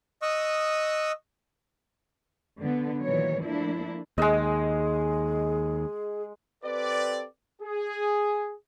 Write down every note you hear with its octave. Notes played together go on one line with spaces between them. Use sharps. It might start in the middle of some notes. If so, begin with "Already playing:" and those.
D#5 C#6 D#6 E6 F#6
D3 B3
A#2 D#3 E3 F#3 C#5
F3 A3 A#3 D4 E4
D#2 G#3 G#4 D#5
C4 G4 A4 B4 D5
G#4